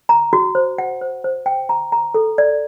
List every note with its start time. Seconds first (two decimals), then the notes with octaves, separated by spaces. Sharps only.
0.09 A#5
0.33 F#4
0.55 C5
0.78 F#5
1.01 C5
1.24 C5
1.46 G5
1.69 A#5
1.92 A#5
2.14 A4
2.38 D5